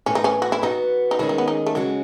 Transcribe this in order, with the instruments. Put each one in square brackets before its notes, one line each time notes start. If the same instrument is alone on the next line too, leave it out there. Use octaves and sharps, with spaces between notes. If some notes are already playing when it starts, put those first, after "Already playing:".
[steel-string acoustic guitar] A2 E3 A3 [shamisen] C#4
[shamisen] D#4
C#4
F#4
E4
[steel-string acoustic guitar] E3 B3 F#4 [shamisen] D#4
[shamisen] D#4
[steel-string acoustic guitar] D#3 G#3 C#4 G#4 [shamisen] E4
[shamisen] D#4
B3
D#4
A3
[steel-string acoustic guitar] C#3 G#3 C#4 F#4 [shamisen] F#3